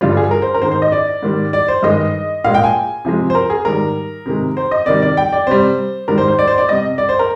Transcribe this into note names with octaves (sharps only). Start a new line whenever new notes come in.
G2 D3 G3 F4
G#4
A#4
C5
A#4
G#2 D#3 G#3 C5
C5
D#5
D5
G#2 D#3 G3
D5
C5
G2 D#3 G#3 D#5
A#2 G#3 F5
G5
G#5
C3 F3 G#3
C5
A#4
G#4
G#2 D#3 G3 A#4
C3 D#3 G#3
C5
D#5
C3 D#3 G3 D5
D5
G5
D5
C3 G3 C5
G#2 D#3 G3 A#4
C5
C5
D5
C5
D5
C3 G3 D#5
D5
C5
A#4